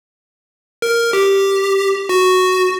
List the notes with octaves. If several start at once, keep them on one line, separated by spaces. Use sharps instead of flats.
A#4
G4
F#4